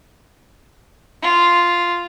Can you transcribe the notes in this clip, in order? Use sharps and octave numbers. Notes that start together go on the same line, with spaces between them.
F4